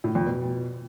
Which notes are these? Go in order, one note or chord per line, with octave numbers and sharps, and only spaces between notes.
A2
F2
B2